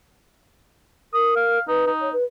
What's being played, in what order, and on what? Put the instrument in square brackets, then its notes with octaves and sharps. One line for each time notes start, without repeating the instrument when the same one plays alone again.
[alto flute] A#4 [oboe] D#6
[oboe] F5
[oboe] D#4 [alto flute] B4
[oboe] D#4
[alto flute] C#5
B4